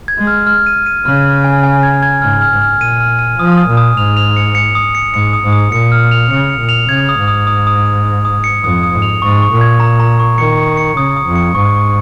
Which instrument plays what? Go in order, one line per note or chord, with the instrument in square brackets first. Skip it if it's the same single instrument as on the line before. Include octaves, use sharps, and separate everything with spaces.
[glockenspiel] G#6
[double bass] G#3
[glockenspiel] F6
F6
D#7
D#7
[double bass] C#3 [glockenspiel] F6
[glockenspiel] G#6
G#5
G#5
G#6
G#6
[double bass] G#2 [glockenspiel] F6
[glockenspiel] F6
[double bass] G#2
[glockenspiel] F6
[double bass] A#2 [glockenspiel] D#7
[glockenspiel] F6
D#7
[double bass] F3 [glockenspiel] D#6
[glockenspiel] D#6
[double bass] A#2
[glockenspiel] D#6
[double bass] G#2 [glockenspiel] F7
[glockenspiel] F7
C#7
C#7
D#6
C#7
[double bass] G#2 [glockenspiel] C#7
[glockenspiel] D#6
[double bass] G#2
[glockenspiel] D#6
[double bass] A#2 [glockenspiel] C#7
[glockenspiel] F6
F7
[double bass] C#3 [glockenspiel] C#7
[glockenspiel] C#7
[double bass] A#2
[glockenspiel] F7
[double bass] C#3 [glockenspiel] G#6
[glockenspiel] D#6
[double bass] G#2
[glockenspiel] D#6
D#6
D#6
D#6
D#6
D#6
C#7
[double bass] F2 [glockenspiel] D#6
[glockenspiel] D#6
[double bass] G#2
[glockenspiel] F7
[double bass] G#2 [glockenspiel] C#6
[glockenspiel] C#6
[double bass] A#2
[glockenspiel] G#6
A#5
A#5
C#6
[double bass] D#3 [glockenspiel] C#7
[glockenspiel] C#7
C#7
[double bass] C#3 [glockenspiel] D#6
[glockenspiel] D#6
[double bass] F2
[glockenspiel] C#7
[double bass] G#2 [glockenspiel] C#6
[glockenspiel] C#6